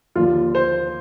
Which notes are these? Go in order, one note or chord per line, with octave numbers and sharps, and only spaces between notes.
D#2 D3 F3 F4
C5